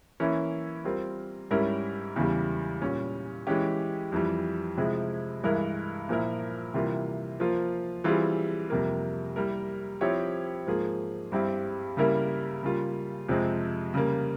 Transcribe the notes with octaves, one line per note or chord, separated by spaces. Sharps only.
E3 A#3 C#4 E4
G3 C4 F4 A#4
G#2 G3 C#4 E4 A#4
E2 C#3 E3 G3
A#2 G3 C#4
E3 G#3 C#4 G4
F2 E3 G3
C3 F3 G#3 E4 G#4
G2 E3 G#3 E4 A#4
A#2 F3 A#3 E4 A#4
C3 E3 G3 A#3 F4
F3 A#3 F4
E3 G3 C4 F4 G#4
F2 C3 G3 A#3
G3 A#3 E4 A#4
F3 C4 E4 G4 C#5
G#2 F3 A#3 F4 G#4
G2 G3 C4 E4 G4
C#3 G3 A#3 E4 A#4
C#3 G3 A#3 F4
F2 C3 F3 G#3 C4
C#3 G3 A#3